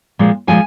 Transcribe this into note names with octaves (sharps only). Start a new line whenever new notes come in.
A#2 F3 G#3
A#2 F3 G#3 G#5